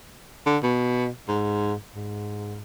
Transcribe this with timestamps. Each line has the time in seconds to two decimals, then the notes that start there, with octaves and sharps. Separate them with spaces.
0.46 D3
0.63 B2
1.28 G#2
1.95 G#2